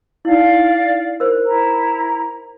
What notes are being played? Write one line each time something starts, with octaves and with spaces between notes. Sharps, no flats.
D#4 E4 D5 F5
A#4 C5
E4 A#5